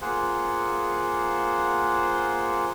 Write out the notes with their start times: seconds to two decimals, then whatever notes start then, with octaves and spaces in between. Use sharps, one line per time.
0.02 A#3 F4 G#4 C5 F#5